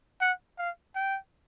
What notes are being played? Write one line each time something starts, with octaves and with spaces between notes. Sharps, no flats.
F#5
F5
G5